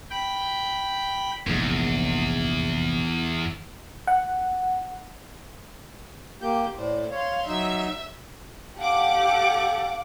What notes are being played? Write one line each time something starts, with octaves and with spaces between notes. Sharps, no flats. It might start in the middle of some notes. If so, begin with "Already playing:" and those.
G5 B5
F1 A#1 E2 G#2
F#5
A#3 G4 G6
A2 C5 D5
C#5 F5 C6
F#3 D#4 E5
G4 A4 F5 F#5 D6